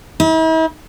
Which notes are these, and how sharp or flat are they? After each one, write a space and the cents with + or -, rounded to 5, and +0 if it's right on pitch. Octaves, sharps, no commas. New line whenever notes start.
E4 -45